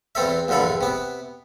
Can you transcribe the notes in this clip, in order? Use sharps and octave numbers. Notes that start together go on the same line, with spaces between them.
E2 E3 C4 A4 E5
A#1 E2 G2 D3 A4 B5
C3 B3